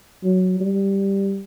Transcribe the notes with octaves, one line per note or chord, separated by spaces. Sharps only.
F#3
G3